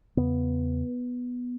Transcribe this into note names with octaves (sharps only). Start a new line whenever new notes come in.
E2 C#3 B3